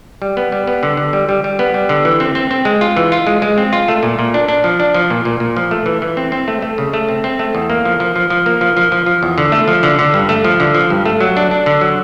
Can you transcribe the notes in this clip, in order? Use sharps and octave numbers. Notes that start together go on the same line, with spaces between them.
G3
B3
G3
B3
D3
D3
G3
G3
G3
B3
G3
D3
E3
C4
C4
C4
G#3
F4
E3
F4
G#3
G#3
C4
F4
A3
A#2
A#2
D4
D4
F3
D4
F3
A#2
A#2
A#2
F3
A3
E3
E3
C4
C4
A3
A3
C#3
A3
C4
C4
A3
E2
A#3
F3
F3
F3
F3
A#3
F3
F3
F3
F3
E2
D3
A3
F3
D3
D3
G2
A3
F3
D3
F3
G2
A3
F#3
D4
D4
D3
F#3